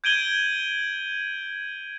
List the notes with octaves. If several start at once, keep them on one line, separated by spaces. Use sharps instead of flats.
G6 G#6 D7 D#7 F#7 G7